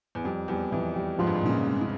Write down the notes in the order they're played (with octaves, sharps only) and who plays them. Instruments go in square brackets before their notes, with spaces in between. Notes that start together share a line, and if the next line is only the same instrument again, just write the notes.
[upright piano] E2
[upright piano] F2 [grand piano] G3
[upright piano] E2 [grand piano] G3
[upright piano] F2 [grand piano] E3
[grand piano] G3
[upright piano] G#2 [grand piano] F3
[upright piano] G2
G#2
[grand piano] A#2 [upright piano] C#3
[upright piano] C3
[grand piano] G#3
[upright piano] C#3